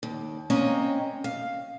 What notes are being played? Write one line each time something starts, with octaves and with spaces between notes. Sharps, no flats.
D#2
A#3 C4 C#4 C#5 D#5 A#5
F5